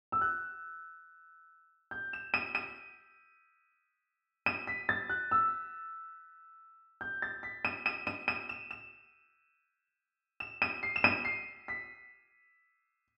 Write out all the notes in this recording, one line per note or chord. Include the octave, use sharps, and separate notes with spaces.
E6
F#6
G6
E7
D#7
D#7
D#7
B6
A6
F#6
E6
G6
A6
B6
D#7
D#7
D#7
D#7
E7
E7
E7
D#7
C7
E7
D#7
C7
B6